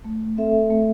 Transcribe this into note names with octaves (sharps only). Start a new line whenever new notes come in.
A3
C4 A4 E5
A3